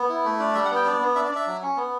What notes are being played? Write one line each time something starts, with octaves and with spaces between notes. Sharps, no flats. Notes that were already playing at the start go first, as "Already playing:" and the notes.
Already playing: B3
E4
A3
D4
G3 E5
F#5
B3 G5
D4
B3
D4 E5
D5
D4 E5
F#3
C#4
B3